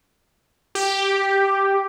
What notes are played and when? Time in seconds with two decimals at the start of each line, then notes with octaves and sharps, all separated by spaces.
0.75 G4